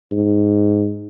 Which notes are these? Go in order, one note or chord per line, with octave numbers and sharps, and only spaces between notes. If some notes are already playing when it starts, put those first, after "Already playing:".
G#2